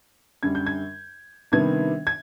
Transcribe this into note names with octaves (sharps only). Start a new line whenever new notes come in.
F#2 D3 G3 G#6
G6
G#6
C3 D#3 G3 B3 D4 G#6
G#6